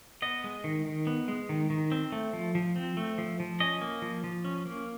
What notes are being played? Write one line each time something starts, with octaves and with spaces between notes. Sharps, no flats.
B3 D#5
G#3
D#3
D#3
B3
G#3
D#3
D#3
C4
A3
F3
F3
C4
A3
F3
F3
C#4 D#5
A#3
F3
F3
C#4
A#3